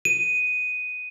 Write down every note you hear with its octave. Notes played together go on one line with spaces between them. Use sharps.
D#7